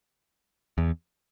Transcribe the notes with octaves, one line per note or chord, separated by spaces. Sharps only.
E2